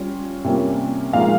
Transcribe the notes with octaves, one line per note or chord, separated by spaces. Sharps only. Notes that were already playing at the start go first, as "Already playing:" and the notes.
Already playing: G3 C#4 F4
C3 G3 A#3 C#4 F4
A#2 F3 G#3 D#4 F5